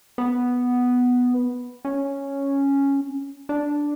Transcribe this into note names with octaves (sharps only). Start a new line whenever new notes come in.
B3
C#4
D4